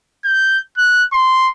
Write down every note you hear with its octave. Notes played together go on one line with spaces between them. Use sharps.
G6
F#6
C6